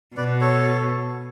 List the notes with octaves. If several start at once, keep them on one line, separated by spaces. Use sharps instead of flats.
B2 B4 D5
A4 C#5